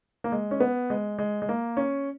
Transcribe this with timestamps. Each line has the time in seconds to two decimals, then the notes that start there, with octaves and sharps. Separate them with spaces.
0.24 A#3
0.32 G#3
0.51 C#4
0.60 B3
0.90 G#3
1.19 G#3
1.42 G#3
1.49 A#3
1.77 C#4